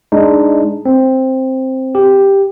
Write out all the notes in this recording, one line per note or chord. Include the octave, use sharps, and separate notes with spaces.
G#3 D4 D#4
C4
G4